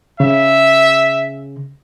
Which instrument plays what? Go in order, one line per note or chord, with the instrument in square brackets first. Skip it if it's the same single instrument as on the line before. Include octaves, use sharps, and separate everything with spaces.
[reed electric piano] C#3 [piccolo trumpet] E5